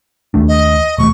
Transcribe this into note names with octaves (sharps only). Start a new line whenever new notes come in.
D#2 A3 D4
D#5
E1 D#2 A3 C#6